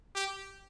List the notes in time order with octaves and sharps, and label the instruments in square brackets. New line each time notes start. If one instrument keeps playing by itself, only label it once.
[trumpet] G4